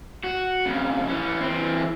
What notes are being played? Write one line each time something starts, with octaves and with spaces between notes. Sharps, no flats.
F#4
F2 C#3
E3 C#4
E3 C4